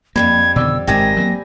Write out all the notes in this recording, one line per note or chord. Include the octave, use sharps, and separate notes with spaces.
F2 G#2 G3 A#3 B5 G#6
B2 D3 D#3 D5 E6
G#1 C3 D#3 G#3 C4 G4 G#5 A#6
F#3 A3 A#3